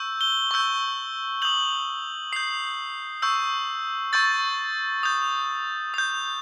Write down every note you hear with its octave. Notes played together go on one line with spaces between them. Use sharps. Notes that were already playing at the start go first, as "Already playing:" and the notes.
Already playing: C#6 E6 G6
G7
C#6 E6 G6
D#6 G6 F#7
D#6 G6 C7
C#6 E6 G6
C#6 E6 G6 A6
D#6 G6
D#6 G6